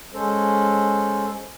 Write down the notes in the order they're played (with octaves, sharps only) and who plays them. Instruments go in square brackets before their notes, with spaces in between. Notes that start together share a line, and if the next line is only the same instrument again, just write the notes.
[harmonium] G#3 C#4 A4 C5